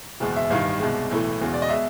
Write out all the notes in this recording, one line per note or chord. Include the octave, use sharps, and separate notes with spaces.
F#1 E2 B2 G#3
E5
A1 G2 D#3 F5
C2 B2 G#3
B1 A2 E3 A3
E1 E2 C#3
D5
D#5
B2 G#3 E5